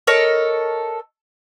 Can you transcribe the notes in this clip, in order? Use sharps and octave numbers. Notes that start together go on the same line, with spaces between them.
A4 A#4 C#5 D#5